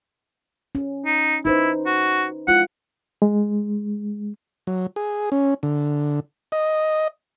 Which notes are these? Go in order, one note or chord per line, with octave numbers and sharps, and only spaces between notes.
C#4
D#4
D#4 E4 B4 C5
F#4
G#3 E4 F4 F#5
G#3
F#3
G#4
C#4
D3
D#5